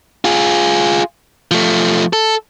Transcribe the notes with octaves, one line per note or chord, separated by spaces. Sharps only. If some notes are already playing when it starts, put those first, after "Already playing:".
F4 G#4
F3 A3
A4